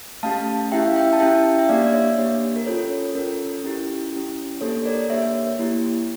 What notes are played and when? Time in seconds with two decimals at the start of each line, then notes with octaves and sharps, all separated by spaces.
0.23 A3 C#4 G4 F5 A5
0.72 C#4 E4 G4 E5 G5
0.88 F5
0.96 E5 G5
1.13 A5
1.20 C#4 E4 G4 E5 G5
1.59 E5
1.69 A#3 D4 G4 D5 F5
1.82 D5
1.93 C#5 E5
2.18 A#3 D4 G4
2.56 A#4
2.66 C#4 F4 A4 C#5
3.15 C#4 F4 A4 A#4
3.64 C#4 E4 G4
4.12 C#4 E4 G4
4.61 A#3 D4 G4 A4 C#5
4.85 A#4 D5
5.10 A#3 D4 G4 C#5 E5
5.59 A#3 E4 G4